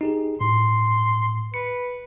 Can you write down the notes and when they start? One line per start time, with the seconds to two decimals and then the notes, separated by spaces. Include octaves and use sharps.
0.01 D#4 G4 G#4
0.41 A2 C6
1.54 B4 C#7